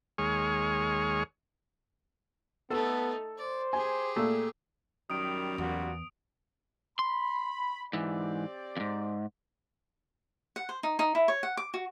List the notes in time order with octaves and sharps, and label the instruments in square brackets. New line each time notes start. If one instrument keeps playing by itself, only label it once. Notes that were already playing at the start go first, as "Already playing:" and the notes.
[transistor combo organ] D#2 G#3 G#4 C#5 C#6 F6
[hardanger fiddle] A3 D#4 [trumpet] B3 [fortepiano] A4
[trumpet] C5 [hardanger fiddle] D5
[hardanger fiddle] G4 G#4 [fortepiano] G#5
[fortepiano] A#2 A3
[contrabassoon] F#2 [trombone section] D#3 G3 [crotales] D#6 D7
[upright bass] E2 [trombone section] A#2 G3 F#4
[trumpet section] B5 [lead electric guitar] C6
[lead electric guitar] G#2 E3 [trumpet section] C4 G4 D5
[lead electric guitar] F2 G#2
[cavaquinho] F#5
C5
D#4
D#4
E4
C#5
F#5
D6
F#4